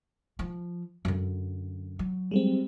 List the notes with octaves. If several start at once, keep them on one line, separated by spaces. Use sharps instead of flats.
F3
F#2 D3
F#3
G3 G#3 C4